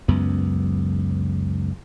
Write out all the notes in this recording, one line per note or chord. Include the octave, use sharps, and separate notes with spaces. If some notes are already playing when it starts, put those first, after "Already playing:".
C#2 F#2 B3